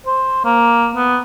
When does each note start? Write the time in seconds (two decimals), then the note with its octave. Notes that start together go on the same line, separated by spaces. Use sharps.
0.06 C5
0.45 A#3
0.95 B3